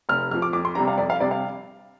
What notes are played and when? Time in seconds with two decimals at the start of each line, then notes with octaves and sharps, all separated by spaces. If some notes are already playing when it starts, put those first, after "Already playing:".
0.09 F1 F6
0.31 F2 F6
0.34 F3
0.42 D6
0.53 F2 D6
0.65 C6
0.75 C3 G3 D4 A#5
0.88 F5
0.98 F2 D5
1.10 F5
1.20 C3 G3 D4 D5
1.31 F5